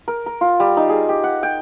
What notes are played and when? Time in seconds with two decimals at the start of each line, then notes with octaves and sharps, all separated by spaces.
0.08 A#4
0.26 A#4
0.41 F4
0.60 G3
0.77 D#4
0.89 G#4
1.09 G4
1.24 F#5
1.43 G5